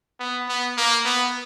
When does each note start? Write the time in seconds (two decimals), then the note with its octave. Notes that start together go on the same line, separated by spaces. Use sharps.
0.20 B3
0.49 B3
0.77 A#3
1.05 B3